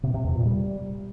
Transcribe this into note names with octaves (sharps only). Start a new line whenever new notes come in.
C3
C3
E2
A#2
G3